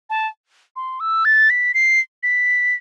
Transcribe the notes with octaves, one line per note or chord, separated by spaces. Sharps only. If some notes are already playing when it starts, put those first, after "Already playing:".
A5
C6
E6
A6
B6
C7
B6